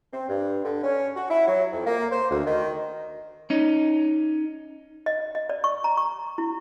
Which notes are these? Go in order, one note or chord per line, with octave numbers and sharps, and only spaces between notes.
C4
G2
D3
C#4
F#4
E4
F#3
F2
A#3
C5
D2
D#3
C#4 D#4
D#5
D#5
D5
C#6
A#5
C#6
E4